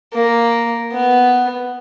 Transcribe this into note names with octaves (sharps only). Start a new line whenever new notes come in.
A#3
B3